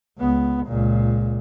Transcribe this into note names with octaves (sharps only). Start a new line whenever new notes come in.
C#2 B3
C#2 A#2